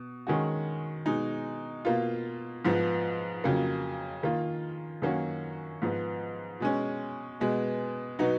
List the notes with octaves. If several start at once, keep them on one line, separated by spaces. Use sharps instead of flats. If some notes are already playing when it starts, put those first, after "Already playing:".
Already playing: B2
D#3 G#3 C#4 F#4
B2 G#3 D#4
B2 A#3 F4
G#2 F3 B3
F2 C#3 F#3 A#3
D#3 A#3 F4
F#2 D#3 A#3 C#4 F#4
G#2 F3 B3
B2 G#3 C#4
B2 G#3 B3
B2 F#3 B3 D#4 F#4